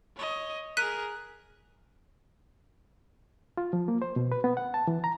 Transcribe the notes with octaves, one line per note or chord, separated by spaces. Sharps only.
C#5 D#5
G#4 A#4 F#6 B6 D#7
F4
F3
A#3
C5
B2
B4
B3
F#5
A5
E3
A#5